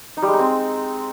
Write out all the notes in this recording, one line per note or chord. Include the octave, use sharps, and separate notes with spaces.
D#4
G3
G#3
D#4
C4